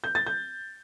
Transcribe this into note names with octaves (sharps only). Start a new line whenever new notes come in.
G6
A6
G6